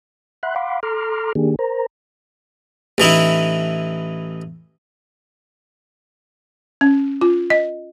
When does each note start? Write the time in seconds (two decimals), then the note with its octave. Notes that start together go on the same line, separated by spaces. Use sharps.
0.43 E5 F#5 B5 C6 F#6
0.56 F5 F#5 B5 C6 D6
0.83 A4 A#5 C6 D6 F6
1.35 D#3 A#3 D4 G4 G#4
1.59 A#4 C5 A#5
2.98 A1 E3 D#4 E4
6.81 C#4
7.21 F4
7.50 D#5